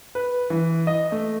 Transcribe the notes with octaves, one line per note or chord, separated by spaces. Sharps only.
B4
E3
D#5
A3